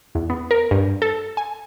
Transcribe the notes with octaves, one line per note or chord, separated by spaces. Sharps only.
E2
B3
A#4
G2
A4
G#5